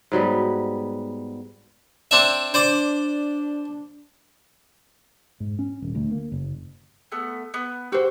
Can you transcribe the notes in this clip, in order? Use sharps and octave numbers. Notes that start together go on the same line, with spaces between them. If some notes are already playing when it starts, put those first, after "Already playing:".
G#2 F#3 G3 B3
C4 D4 E5
D4 C5 D5 D6
G#2
C#4
D#1
D2
A#3
F#1
A3 B3
B3
F#4 G4 C5 E6